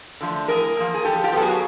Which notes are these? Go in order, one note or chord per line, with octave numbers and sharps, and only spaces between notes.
D3 F3 A3
A2 G#4 A#4
F3 A#3
G#4
D3 G4 A4
F4 G4
F#3 B3 A4
F#4 G#4